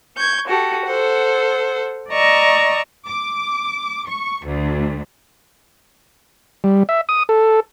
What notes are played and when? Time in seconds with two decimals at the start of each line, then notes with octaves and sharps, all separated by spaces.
0.16 C#6 G6 G#6
0.47 F#4 G4 A4
0.86 A4 C5 F#5
2.11 D5 D#5 A#5 C#6 E6
3.10 D6
4.11 C#6
4.47 D2
6.64 G3
6.89 E5
7.09 D#6
7.29 A4